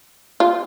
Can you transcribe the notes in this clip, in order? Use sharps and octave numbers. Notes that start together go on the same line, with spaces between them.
F4